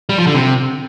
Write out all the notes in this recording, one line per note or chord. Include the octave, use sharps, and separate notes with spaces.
G3
F3
D3
C3